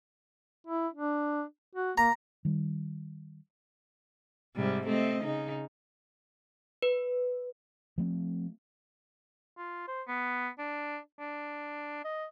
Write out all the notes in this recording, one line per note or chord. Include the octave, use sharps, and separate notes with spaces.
E4
D4
F#4
A#3 A#5
D#3 G3
G#2 C3 G3
A3 C4 D#5
C#3 D#4
B4
F3 A3 C4
F4
C5
B3
D4
D4
D#5